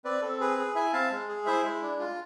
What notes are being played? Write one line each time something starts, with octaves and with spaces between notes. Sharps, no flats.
C4 B4 D5
C4 A4
G#4 B4
G#4
E4 E5 G#5
C4 F5 A5
G#3
G#4
E4 C5 E5
G#3
D4
F4